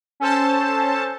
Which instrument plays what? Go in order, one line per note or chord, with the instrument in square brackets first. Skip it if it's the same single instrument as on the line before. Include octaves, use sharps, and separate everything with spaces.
[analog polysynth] C#4 A4 C5 A5